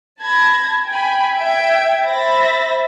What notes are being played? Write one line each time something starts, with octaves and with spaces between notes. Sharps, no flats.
A5 B5 G#6 A#6
G5 G#5 B5
E5 G5 G#6 D7
C5 E5 B5 A6 A#6